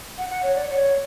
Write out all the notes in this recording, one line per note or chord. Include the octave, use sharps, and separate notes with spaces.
F#5
F#5
C#5
D5
C#5